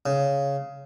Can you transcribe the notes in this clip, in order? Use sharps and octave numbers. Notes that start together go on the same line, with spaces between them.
C#3